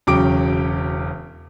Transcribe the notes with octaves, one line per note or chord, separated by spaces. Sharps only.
E1 C#3 F#3 G5 D6 D7